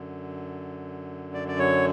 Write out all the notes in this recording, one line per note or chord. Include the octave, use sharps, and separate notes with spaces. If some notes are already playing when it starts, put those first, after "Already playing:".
Already playing: F#2 D3
D5
D5
C#5